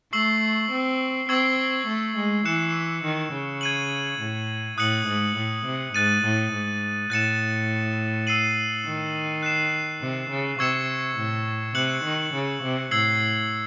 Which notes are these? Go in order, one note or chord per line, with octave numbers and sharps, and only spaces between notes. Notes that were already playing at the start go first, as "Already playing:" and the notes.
A3 C#6 E6 C7 F#7
C4
C4 C#6 E6 G#6 C7 F#7
A3
G#3
E3 F#6 C#7 E7
D#3
C#3
G#6 D#7 F#7
A2
A2 D#6 F#6 C#7 F#7
G#2
A2
C3
G#2 F#6 A6 D#7
A2
G#2
A2 F#6 A6 C#7 E7
E6 C7 D#7 F#7
D#3
F#6 C7 E7
C3
C#3
C3 C#6 E6 G#6 C#7 E7
A2
C3 F#6 C#7 F#7
D#3
C#3
C3
A2 E6 G#6 C7 F#7